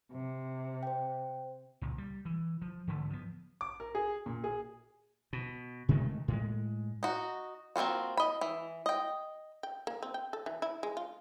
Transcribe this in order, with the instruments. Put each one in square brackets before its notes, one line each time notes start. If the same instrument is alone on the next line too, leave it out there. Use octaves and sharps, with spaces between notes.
[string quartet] C3
[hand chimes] C5 G5
[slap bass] C#2 A#2
G3
E3
F3
G#2 D3 E3 A3
F3 B3
[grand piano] D6
A#4
G#4
A#2
G#4
[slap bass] B2
C3 D#3 G#3 A3
A2 G#3
[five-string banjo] D#4 F#4
A#3 C4 C#4 F4 F#4
D#5 B5
E3
D#5 G5
[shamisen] G5
A#3
C4
G5
A4
E3
E4
G#3
F4